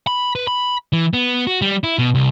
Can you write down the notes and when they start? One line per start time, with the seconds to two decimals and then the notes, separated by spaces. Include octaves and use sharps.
0.07 B5
0.35 B4
0.47 B5
0.93 E3
1.14 B3
1.47 F#4
1.62 G3
1.84 E4
1.99 B2
2.15 C2